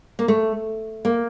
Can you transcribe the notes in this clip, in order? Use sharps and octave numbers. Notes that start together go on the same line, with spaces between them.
A#3
A3
A#3